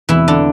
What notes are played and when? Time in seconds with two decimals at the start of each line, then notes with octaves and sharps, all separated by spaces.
0.09 E1 E2 C3 E3 E4
0.28 D3 D4